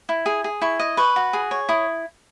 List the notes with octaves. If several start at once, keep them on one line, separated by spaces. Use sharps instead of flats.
E4
G#4
G#4
E4 C#6
D#5
B4 C#6
F#4
G#4
C#5
E4 D#6